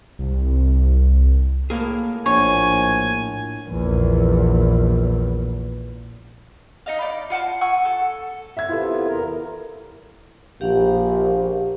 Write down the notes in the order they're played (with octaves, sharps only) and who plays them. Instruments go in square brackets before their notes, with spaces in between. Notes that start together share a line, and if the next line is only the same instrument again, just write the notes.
[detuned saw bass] C2
[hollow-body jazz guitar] A2 A#3 G#4
[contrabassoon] A#1 [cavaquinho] C#5 [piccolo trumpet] G#5
[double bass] A#1 E2
[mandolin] D#4 D#5 F5
D5 F5 B5
F4 F#5 G5 A5
F#5 G#5 C#6 E6
A4
[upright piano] E5 G#6
[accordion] C3 B3 F4 [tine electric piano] E4 A4
[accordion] E2 A#4
[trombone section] A#1 [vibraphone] G4 F5 F#5